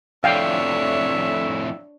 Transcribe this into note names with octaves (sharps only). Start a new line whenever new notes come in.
F2 A2 D4 C#5 E5 F5 G5